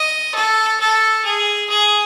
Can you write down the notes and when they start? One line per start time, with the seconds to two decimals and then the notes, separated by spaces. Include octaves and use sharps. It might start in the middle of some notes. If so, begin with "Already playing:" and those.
Already playing: D#5
0.34 A4
0.80 A4
1.24 G#4
1.69 G#4